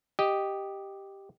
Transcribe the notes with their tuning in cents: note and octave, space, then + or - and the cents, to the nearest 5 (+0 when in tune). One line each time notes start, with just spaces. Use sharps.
G4 +0 D#5 +0